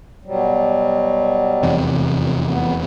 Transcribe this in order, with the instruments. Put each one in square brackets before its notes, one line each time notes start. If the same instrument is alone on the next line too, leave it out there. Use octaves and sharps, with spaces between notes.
[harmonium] B2 F#3 G3
[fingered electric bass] F1 E2 C3
[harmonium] B3